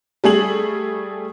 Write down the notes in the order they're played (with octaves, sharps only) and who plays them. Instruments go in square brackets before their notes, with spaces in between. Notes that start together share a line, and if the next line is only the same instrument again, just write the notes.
[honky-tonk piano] G3 A3 G#4 F#7